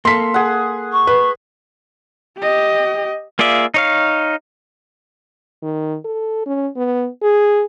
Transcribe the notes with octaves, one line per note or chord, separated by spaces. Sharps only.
A#3 A4 C6 B6
G#4 F#5
C#6
B4
G4 D#5
A#3 F4 G#4 D5 E5
D#4 C#5 F5
D#3
A4
C#4
B3
G#4